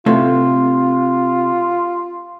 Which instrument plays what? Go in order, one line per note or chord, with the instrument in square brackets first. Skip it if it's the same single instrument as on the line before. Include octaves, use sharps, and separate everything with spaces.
[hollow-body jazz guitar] C3 [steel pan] A3 [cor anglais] F4